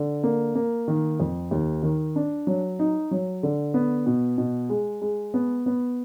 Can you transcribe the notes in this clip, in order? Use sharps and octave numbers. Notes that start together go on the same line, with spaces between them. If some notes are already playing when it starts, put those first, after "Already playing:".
Already playing: D3
A#3
A#3
D#3
F2
D#2
D#3
D4
F#3
D#4
F#3
D3
B3
B2
B2
G#3
G#3
B3
B3